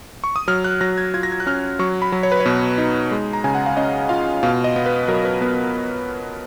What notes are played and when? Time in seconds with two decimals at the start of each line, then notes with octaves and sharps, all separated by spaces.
0.24 C#6
0.36 D#6
0.48 F#3 F6
0.64 F#6
0.81 F#3 A#6
0.98 G#6
1.14 F4 G#6
1.23 A#6
1.32 G#6
1.40 F#6
1.46 C#4 F6
1.79 F#3 C#6
2.02 B5
2.12 F#3
2.23 C#5
2.32 B4
2.40 C#5
2.46 B2
2.78 D#4
3.11 G#3
3.33 A#5
3.44 C#3 G#5
3.55 F#5
3.66 F5
3.77 C#4 D#5
4.09 F4 F5
4.43 B2 F5
4.64 D#5
4.76 B3
4.86 B4
5.08 F#3 A#4
5.25 B4
5.41 B3 B4